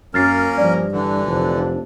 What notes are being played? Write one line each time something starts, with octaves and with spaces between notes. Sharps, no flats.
F#2 A#3 C#4 A#4 F6 A6 C7
G2 F3 D5
D3 E3 D4
F1